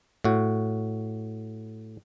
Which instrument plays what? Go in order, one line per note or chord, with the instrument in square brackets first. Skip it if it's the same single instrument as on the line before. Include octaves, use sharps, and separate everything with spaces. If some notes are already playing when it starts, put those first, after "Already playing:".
[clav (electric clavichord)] A2 F#4